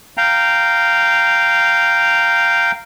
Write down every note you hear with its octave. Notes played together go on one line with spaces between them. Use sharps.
F5 G5 A#5